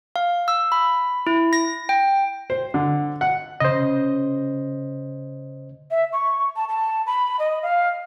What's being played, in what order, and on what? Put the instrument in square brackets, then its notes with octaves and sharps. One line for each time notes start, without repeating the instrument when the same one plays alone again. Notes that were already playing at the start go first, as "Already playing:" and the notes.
[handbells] F5
E6
B5
E4
A#6
G5
[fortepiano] C5
D3
F#5
[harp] C#3 [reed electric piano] C5 D#5
[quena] E5
C#6
A5
A5
B5
D#5
F5